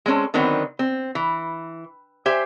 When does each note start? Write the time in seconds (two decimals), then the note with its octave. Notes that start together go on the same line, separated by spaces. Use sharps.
0.06 G#3 C4 C#4 A4
0.34 D3 D#3 F#3 B3 C4
0.79 C4
1.15 E3
2.26 G4 C5 E5 G#5